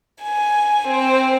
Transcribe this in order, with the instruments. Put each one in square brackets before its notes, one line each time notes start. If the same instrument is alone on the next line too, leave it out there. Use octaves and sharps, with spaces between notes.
[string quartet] G#5
C4